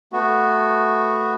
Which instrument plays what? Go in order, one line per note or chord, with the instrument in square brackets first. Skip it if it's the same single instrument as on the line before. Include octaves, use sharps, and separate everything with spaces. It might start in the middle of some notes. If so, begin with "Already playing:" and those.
[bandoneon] A3 B3 F#4